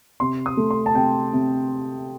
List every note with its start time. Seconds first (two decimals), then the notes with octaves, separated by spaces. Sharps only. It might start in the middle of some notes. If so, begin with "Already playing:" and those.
0.20 C3 C6
0.46 D#6
0.57 A3
0.71 C6
0.86 A5
0.95 C3 G5
1.33 C3